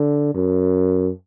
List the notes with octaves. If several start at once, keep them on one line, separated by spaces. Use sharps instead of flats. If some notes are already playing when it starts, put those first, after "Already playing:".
Already playing: D3
F#2